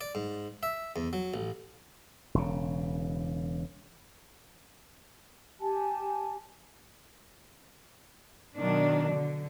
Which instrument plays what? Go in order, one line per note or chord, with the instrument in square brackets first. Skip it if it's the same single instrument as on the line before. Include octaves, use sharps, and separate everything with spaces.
[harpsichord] D5
G#2
E5
E2
F#3
A1
[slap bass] E1 C#3
[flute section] G4 G#5 A5
[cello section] B2 D#3 F#3 D4
D3